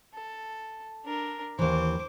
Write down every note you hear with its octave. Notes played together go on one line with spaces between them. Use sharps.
A4
D4 A#4
D#2 E3 C5 D6